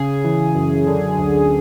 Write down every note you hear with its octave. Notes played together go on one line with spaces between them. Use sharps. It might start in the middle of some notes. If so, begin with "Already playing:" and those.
Already playing: C#3 G#4
E3
F#2
D3
D2